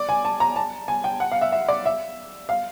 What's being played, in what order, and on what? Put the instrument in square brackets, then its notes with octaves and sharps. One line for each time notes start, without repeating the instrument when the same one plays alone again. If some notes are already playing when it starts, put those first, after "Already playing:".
Already playing: [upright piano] D5
G#5
A5
A#5
A5
G#5
G5
F#5
F5
E5
E5
D5
E5
F5